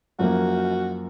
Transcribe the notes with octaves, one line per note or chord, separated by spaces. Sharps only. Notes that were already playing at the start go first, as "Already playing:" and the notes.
F#2 F3 A#3 F#4